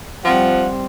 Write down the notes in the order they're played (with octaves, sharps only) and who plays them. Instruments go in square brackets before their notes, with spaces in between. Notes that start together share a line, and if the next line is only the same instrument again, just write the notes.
[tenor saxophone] F3 [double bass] G3 C4 [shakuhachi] F#5